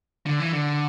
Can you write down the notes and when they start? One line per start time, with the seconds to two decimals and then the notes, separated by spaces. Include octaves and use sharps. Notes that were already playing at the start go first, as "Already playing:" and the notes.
0.26 D3
0.40 E3
0.53 D3